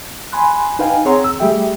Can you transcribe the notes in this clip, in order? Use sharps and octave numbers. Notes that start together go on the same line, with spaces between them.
G#5 B5 C6 F#6
D#4 B4 F5 G5 G#5
C4 G#4 C#5 F#5 A#5 C6
E6
G3 A3 G4 G#4 E5 G5